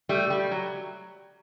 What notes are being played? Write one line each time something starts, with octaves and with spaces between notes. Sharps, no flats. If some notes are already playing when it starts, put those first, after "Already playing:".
G3 A3
G3
F#3